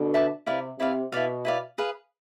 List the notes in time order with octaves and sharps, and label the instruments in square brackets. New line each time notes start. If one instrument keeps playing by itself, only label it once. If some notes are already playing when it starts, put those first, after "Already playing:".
Already playing: [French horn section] B2 D3
[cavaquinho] B4 E5 A5 D6
[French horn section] C3 [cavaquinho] E4 B4 D5 F5
[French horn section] C3 [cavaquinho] E4 B4 D5 F5
[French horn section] B2 [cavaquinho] E4 B4 D5 F5
[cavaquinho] E4 B4 D5 F5
G#4 B4 F5